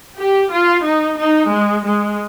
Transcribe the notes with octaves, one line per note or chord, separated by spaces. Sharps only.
G4
F4
D#4
D#4
G#3
G#3